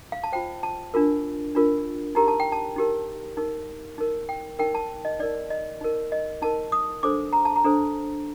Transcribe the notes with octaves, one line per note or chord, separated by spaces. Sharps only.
F5
A5
F4 C5 G5
A5
D4 F4 A#4
D4 F4 A#4
D#4 G4 A#4 A#5
A5
G5
A5
D#4 G4 A#4
D#4 A#4
D#4 A#4
G5
D#4 A#4 G5
A5
D#5
D#4 A#4 D5
D#5
D#4 A#4
D#5
D#4 A#4 A5
D#6
D4 A4 C5 D6
A#5
A5
A#5
D4 A4 C5